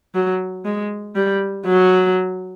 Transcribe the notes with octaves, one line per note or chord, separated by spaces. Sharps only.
F#3
G#3
G3
F#3